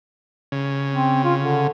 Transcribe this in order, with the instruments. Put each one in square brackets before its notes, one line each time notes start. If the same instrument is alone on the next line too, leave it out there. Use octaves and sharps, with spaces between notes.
[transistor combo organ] C#3
[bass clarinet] C4
F4
D3